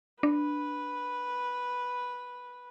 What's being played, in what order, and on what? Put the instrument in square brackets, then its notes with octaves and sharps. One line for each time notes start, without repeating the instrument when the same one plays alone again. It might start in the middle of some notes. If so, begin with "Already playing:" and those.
[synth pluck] D4 [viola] B4